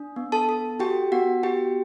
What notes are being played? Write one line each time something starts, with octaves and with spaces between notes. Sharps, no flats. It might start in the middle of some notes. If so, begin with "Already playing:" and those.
Already playing: D4
B3
A4 A5
A4
F#4 G4 G5
B3 F#4 F#5
F#4 G4 G5